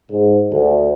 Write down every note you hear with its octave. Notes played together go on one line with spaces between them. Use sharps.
G#2
D2